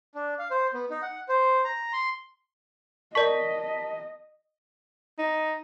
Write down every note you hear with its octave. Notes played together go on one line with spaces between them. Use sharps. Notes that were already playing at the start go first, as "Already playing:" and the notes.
D4
F5
C5
B3
D#4
F#5
C5
A#5
C6
A#4 D5 D#5 A5 C#6 B6
D#4